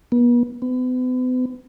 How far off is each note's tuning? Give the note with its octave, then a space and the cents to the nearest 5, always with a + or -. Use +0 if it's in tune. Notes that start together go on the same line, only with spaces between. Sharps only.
B3 -40
B3 +40